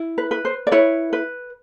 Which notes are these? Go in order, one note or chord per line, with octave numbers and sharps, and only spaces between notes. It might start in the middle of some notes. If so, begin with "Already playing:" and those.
Already playing: E4
B4
B4
C5
D5
E4 B4 C#5
B4